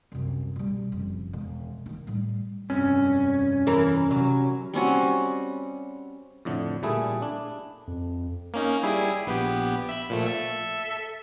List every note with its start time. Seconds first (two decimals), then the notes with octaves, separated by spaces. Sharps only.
0.12 C2 F#2
0.56 B2 G3
0.92 F#1 F2
1.33 E1 G#3
1.86 D#3 D#4
2.07 A2 G3
2.70 F1 G2 C4 C#4
3.67 E3 A#4
4.11 C3 F#3
4.73 G3 C4 C#4 F#4
6.45 F2 A2 D3
6.83 A#2 G3 A3 E4 G#4
7.22 D4
7.87 F2
8.54 A#3 C#4 D#4
8.83 G3 E4 G#4
9.26 A#1 B3 G4
9.89 E5 B5
10.09 A#2 F3 A3
10.27 A4 E5